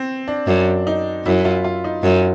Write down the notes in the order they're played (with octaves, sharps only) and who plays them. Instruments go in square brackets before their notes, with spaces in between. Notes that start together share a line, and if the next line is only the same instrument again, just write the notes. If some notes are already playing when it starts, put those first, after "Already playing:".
Already playing: [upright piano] C4
D4
[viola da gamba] F#2 [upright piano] D4
[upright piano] D#4
[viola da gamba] F#2 [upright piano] E4
[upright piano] F4
F4
D#4
[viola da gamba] F#2